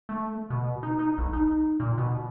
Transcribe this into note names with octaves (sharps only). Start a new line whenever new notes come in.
A3
B2
D#4
D#4
B1
D#4
A#2
B2